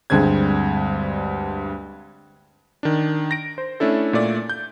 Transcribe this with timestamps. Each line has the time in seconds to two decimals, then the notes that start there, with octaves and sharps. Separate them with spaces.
0.10 D2 G2 G#3 C4 G#6
2.83 D#3 D4
3.31 A#6 D7
3.58 C5
3.80 A3 C#4 D4 E4 A4
4.13 A#2 A3 D5
4.50 G6